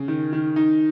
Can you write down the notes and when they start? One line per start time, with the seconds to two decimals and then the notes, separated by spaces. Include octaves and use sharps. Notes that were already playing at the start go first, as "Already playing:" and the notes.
Already playing: C#3
0.08 D#3
0.33 D#3
0.56 D#4